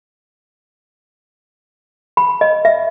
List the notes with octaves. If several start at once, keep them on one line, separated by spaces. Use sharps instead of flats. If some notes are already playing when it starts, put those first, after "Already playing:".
B5
D#5
E5